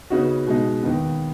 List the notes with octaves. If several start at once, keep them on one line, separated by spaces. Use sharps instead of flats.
C#3 B3 D#4 F#4
B2 G#3 D#4
D#2 D#3 B3